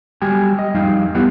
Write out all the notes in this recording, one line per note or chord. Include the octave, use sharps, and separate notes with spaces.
F#3 G3 G4 G5 G#5
D#5
F2 G3 D#4 F5 G5
B3 E4 G4 C#5 F5 F#5